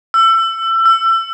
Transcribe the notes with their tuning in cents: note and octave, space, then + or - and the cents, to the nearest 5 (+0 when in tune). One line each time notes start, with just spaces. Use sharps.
E6 +25
E6 +30